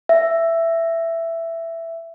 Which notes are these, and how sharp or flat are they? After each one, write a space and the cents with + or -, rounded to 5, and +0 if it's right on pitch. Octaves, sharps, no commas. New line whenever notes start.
E5 +10